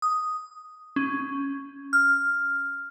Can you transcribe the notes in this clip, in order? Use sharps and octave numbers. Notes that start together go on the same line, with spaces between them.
D#6
C#4
F6